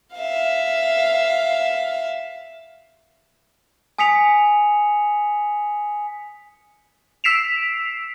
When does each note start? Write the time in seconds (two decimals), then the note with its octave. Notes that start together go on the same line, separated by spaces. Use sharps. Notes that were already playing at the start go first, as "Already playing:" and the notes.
0.15 E5 F5
3.98 G#5 D#6 B6 C#7 F7
7.24 E6 B6 C7 D7 E7 F7